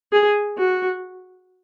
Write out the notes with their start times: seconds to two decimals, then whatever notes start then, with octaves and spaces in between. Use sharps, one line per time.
0.12 G#4
0.57 F#4